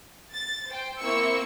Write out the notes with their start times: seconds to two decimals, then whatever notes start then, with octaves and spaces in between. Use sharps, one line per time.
0.31 A6
0.69 C5 G5
1.00 A#3 C4 E4 C#6 E6 C#7